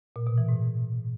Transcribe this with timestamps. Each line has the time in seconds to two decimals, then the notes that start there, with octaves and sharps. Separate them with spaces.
0.16 A#2
0.27 B2
0.38 E3
0.49 G#2